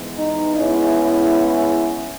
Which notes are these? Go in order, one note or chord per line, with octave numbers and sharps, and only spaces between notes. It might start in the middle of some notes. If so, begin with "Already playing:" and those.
Already playing: G#2 E3 G#3 B3
D#4
C#3 G#3 B3 C#4 E4